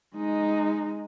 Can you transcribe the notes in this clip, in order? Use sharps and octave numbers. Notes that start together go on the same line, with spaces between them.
G#3 D#4